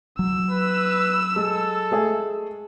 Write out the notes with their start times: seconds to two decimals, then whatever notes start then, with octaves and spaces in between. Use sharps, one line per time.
0.19 F#3 E6
0.51 B4
1.36 G#3 A4
1.91 G#3 A3 G#4